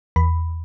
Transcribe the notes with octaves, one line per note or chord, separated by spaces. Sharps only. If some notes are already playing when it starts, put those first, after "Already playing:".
E2 B5